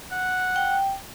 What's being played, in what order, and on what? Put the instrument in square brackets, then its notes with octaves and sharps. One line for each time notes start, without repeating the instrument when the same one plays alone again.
[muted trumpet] F#5
[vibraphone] G5